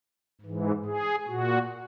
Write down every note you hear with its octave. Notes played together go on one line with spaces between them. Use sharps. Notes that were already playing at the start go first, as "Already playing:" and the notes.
G#2 E3
G#4
A#2 F#4